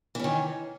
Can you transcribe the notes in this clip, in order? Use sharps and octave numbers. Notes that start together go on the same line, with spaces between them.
D#3 E3 C#4